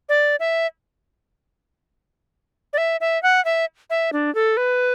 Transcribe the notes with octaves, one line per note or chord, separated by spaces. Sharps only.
D5
E5
D5
E5
E5
F#5
E5
E5
D4
A4
B4